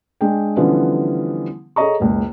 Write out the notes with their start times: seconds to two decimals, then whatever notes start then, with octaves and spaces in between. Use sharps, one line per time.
0.21 G#3 D4 G5
0.56 D3 E3 F3 G3 B3 C#4
1.76 G#4 A4 C#5 D#5 A#5 C#6
2.00 F#1 C#2